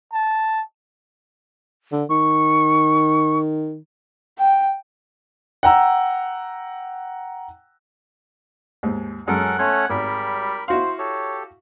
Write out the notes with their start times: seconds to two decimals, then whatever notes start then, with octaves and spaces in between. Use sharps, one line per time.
0.13 A5
1.92 D3
2.10 D#3 C#6
4.39 G5
5.63 F#5 G5 A#5 E6
8.83 D#2 G#2
9.28 F#2 G#3 C#4 A4 A#4 F#5
9.59 A3 C#4 C#5 C6
9.90 G#1 G3 A#4 B5
10.68 E4 F#4 C5 F5
10.99 G4 A4 C#5